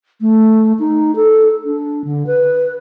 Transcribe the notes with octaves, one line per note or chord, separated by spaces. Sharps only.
A3
D#4
A4
D4
D3
B4